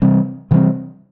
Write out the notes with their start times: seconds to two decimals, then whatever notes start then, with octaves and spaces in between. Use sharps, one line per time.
0.02 C3 E3 G3 C4
0.51 C3 E3 G3 C4